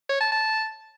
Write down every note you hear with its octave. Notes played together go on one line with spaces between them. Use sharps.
C#5
A5
A5